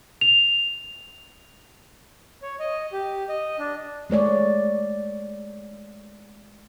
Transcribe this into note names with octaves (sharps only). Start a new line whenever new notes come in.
F7
C#5
D#5
G4
D#5
D4
G#3 A3 C#5 D5